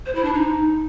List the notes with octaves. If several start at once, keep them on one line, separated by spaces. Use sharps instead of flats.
C5
E4
D4
D#4